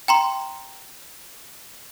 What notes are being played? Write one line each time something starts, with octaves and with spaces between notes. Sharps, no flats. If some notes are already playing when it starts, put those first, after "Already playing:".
G5 A#5 C6